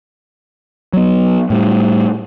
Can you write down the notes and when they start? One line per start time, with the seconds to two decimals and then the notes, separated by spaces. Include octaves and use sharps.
0.93 F#3 B3
1.50 A2 G3